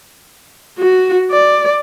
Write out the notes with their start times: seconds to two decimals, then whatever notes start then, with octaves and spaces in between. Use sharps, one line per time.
0.79 F#4
1.31 D5